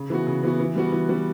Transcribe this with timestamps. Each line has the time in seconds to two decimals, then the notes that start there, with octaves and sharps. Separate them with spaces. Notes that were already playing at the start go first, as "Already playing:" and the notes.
Already playing: C#3
0.10 E3 B3 F#4
0.27 C#3
0.43 E3 B3 F#4
0.60 E3
0.75 G3 B3 F#4
0.92 E3
1.09 G3 B3 F#4